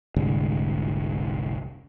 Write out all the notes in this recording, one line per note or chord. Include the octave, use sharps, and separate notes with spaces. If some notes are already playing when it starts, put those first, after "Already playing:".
F1 C2 G#2 D3